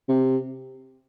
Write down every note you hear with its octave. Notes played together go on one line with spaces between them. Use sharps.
C3